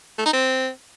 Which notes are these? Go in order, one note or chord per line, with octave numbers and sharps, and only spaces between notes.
A3
D#4
C4